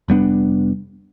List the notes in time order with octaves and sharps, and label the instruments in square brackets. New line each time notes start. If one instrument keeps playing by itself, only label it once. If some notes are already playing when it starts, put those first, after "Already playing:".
[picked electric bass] F1 G3 B3 D4